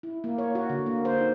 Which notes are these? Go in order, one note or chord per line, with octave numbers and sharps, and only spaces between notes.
E4
A#3
C#5
F#4
D3
A#3
C5
D#4